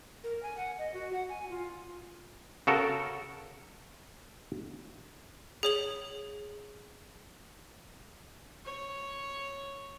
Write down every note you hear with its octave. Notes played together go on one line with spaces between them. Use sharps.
A#4
G#5
F#5
D#5
F#4
F#5
G#5
F4
C#3 F#4 A4 A#4
G#4 C#5 F#7
C#5